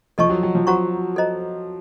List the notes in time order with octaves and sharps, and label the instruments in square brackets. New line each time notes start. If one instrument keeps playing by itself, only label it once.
[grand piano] F3 [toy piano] A4 D#5 A5 C#6
[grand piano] F#3
F#3
F3
[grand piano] F#3 [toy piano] F#4 C5 F#5 A#5 C#6
[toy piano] A4 C5 D#5 A#5